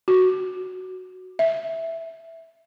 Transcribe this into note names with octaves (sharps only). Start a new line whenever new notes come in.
F#4
E5